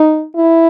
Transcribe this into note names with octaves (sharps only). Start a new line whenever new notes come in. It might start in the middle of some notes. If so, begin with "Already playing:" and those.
Already playing: D#4
E4